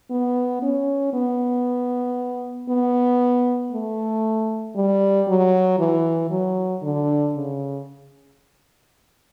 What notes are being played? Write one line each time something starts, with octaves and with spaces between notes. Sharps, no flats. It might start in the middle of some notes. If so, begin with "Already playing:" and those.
B3
C#4
B3
B3
A3
G3
F#3
E3
F#3
D3
C#3